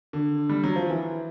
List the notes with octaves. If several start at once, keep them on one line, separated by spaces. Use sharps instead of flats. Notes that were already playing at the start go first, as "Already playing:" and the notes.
D3
G3
F#3
F3
E3